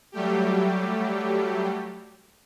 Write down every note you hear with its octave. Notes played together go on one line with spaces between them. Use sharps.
F#3 G3 A3 G4